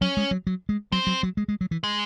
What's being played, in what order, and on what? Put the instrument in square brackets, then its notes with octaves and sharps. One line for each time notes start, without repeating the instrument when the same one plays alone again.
[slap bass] F#3 [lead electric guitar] C#4
[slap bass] G#3
F#3
F#3
G#3
[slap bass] F#3 [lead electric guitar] C4
[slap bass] F#3
F#3
G#3
G#3
F#3
E3
[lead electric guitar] G#3